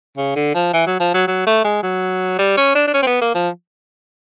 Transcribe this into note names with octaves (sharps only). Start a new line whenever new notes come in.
C#3
D3
F3
E3
F#3
F3
F#3
F#3
A3
G#3
F#3
G3
C#4
D4
D4
C#4
C4
B3
A#3
F3